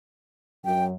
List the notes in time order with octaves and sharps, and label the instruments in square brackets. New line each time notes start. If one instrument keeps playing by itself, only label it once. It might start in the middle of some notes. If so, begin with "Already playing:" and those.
[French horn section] F#2 [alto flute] G5